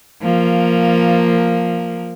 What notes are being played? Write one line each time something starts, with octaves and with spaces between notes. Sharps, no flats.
F3 A#3